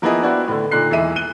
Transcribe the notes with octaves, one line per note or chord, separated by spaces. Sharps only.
F3 A#3 B3 E4 G#4 D#5
B3 C4 D4 E4 F#4
A2 D3
A#2 D3 D#4 F#6 C7
E1 E3 G#4 D#5 E5 D#7
F#6 D#7 G7